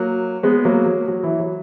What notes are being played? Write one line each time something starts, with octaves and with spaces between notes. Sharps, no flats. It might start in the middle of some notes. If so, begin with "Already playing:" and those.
Already playing: F#3 A#3
G#3 B3
F#3 A#3
F#3
F#3
E3
F#3